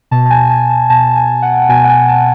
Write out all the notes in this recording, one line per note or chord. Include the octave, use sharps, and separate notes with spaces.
B2 A5
A5
G#5
A5
A5
B2 A5
G#5
F#5
B2 G#5
F#5
G#5
A5